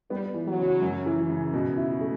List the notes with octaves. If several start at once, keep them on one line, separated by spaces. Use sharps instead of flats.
G3 B3
E3
F#3
C#3
F#2
E3
C#3
B2
E4
A3